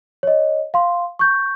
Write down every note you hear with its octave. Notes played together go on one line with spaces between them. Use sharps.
C#5 D#5
F5 C6
C#6 G6